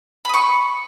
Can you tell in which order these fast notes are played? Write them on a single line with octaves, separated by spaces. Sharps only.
B5 D#6 C#6